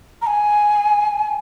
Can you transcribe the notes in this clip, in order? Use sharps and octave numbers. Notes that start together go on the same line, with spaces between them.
A#5
G#5